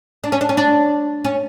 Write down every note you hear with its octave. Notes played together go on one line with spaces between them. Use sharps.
D4
C#4
D4
C#4
D4
C#4